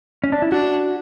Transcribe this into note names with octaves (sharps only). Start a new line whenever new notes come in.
C#4
D4
E4
D4 F#4